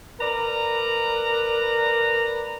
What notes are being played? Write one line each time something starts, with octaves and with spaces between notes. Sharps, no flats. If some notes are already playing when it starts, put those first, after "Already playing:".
A#4 B4 D5 A#5